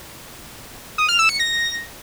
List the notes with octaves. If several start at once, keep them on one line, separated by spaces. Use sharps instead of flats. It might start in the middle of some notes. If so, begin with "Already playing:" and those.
D#6
F6
E6
C#7
A#6